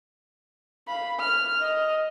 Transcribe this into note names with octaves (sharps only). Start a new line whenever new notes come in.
F5 B5
F6
D#5